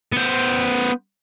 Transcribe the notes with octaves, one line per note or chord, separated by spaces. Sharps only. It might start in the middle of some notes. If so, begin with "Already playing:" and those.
B3 C5